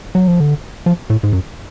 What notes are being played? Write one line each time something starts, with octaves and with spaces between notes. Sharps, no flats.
F#3
F3
D3
F3
A2
G#2
F#2